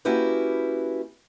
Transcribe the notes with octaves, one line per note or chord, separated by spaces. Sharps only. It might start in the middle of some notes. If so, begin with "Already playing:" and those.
A#3 C#4 E4 F#4 G4 B4